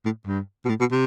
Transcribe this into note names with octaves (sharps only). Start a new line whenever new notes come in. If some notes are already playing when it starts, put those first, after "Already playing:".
A2
G2
B2
A2
B2
C3